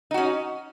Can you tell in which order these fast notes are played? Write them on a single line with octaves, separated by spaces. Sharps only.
D#4 F#4 C#4